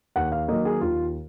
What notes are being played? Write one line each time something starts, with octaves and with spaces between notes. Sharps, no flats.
D#2 F#5
F5
D#3 F#3 A#3 D#5
G#4
D#2 F4